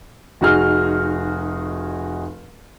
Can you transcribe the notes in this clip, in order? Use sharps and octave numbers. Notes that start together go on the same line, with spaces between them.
F1 D#4 F#4 G#4 F6